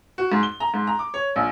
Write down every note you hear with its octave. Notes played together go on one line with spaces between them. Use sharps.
F#4
G#2
G7
A#5
G#2
A#5
D6
C#5
A#1